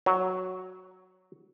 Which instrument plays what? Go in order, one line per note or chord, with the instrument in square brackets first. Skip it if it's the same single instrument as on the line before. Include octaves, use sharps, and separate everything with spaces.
[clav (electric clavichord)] F#3